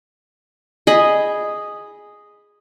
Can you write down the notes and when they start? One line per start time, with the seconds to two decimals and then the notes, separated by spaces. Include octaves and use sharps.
0.87 G#4 D#5 B5